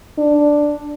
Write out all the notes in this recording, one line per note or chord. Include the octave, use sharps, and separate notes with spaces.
D4